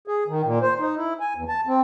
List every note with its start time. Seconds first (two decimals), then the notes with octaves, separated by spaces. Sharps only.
0.08 G#4
0.28 D#3
0.45 A#2
0.62 C5
0.80 D#4
0.97 E4
1.20 G#5
1.36 E2
1.48 A5
1.67 C4